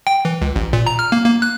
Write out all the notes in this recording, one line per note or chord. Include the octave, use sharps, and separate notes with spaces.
G5
E3
C#2
A1
A#2
A#5
F6
A#3
A#3
F#6